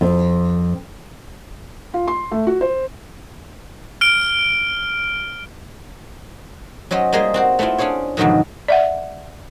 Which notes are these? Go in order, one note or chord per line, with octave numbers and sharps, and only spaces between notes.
F2
F4
C6
A3
F#4
C5
F6 D7
F#3 C#4 C5 D#5
G3 G#3 A#3 G#4 D#5 C6
C4 F#4 C5
A3 B3 C4 E4 F4
C#4 D4 G#4 C5 C#5
F2 G#2 B2 D3 D#3 F#3
D5 E5 F#5